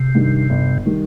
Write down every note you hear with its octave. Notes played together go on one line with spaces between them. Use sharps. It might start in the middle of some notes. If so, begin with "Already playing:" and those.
Already playing: C3
G2 D#3 G3
G1
D#3 G3